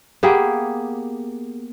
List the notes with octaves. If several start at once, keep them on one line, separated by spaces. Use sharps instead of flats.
A#3 B3 G4 G#4